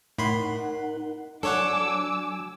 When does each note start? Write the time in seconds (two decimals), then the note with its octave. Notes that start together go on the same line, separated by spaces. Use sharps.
0.18 A2 D#4 A#4 F#5 B5 C6
1.43 F#3 D4 A4 C#5 F#5 G#5 D6 E6